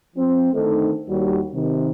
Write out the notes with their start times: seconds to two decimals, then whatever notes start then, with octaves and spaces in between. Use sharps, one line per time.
0.16 F3 C4
0.52 D3 D#3 A3 C4 D#4 A4
1.09 D#2 G3 F#4
1.53 C3 D#3